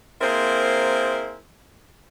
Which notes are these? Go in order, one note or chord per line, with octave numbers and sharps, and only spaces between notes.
A#3 C4 E4 G#4 A#4 C5